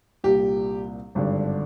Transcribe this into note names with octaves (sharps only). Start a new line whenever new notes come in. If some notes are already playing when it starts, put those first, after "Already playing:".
C2 A#2 G4
G#1 G2 D3